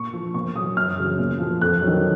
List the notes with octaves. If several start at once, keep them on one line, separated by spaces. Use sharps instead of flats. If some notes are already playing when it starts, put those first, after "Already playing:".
Already playing: A#2 C#6
F3
A#2 C#6
F#3 D#6
F#2 F6
C#3 F#3
A#2
F3
F2 F#6
F#3
D#3